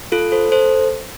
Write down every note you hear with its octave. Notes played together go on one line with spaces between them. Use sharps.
F4 A4
A4 C5
A4 C5